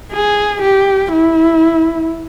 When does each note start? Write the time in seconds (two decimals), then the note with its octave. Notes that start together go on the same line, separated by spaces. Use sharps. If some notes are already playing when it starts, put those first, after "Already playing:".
0.13 G#4
0.62 G4
1.12 E4